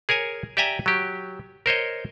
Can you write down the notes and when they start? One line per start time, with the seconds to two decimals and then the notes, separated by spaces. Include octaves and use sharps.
0.09 G#4 A#4 C#5 G#5
0.57 G4 D5 E5 G5 G#5 A#5
0.86 F#3 G4
1.66 A#4 C5 C#5 D#5